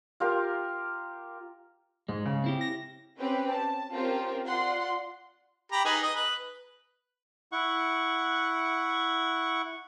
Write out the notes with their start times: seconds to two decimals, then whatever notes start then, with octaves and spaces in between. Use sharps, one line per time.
0.20 F4 G4 A#4 F5
2.09 G#2 G#3
2.25 C#3
2.44 C4 E4 G4
2.61 A#6
3.18 C4 C#4 G4 B4
3.50 A5
3.90 C4 C#4 F4 G4 A#4
4.45 F4 D5 F#5 C6
5.72 G4 A#5 B5
5.85 D#4 G#4 B4
6.02 D#5
6.15 B4
7.52 E4 F#5 C#6